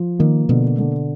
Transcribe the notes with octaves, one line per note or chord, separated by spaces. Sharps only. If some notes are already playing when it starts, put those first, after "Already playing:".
Already playing: F3
D#3 A#3
B2 D3
D3